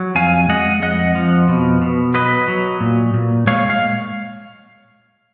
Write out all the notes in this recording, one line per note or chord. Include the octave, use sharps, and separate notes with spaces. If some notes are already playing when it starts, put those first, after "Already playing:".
Already playing: F#3
F2 F5 G#5
G#3 D#5 F#5
F2 D#5 F#5
F3
B2
B2
F#3 B4 D#5
F#3
A#2
A#2
G#3 C#5 F5
F5